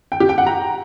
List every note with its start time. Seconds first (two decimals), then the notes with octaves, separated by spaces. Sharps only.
0.12 G5
0.20 G4
0.29 G5
0.38 F#5
0.47 A#5